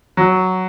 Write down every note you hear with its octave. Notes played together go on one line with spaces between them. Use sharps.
F#3